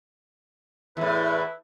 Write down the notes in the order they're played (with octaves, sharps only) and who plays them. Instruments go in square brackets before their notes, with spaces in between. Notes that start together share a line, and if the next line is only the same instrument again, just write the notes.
[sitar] E2 A2 [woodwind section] E4 B4